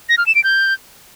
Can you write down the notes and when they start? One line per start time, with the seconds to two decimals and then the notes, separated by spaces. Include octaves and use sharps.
0.09 A#6
0.18 F6
0.26 E7
0.35 D7
0.44 G6